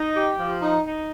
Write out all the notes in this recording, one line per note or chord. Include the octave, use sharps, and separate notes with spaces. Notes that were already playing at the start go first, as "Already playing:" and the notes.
Already playing: D#4
G4
F3
D#4
D#4